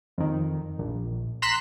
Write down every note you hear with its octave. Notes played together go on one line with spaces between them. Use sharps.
F2 D#3
A#1
A#5 C6 F#6 B6 E7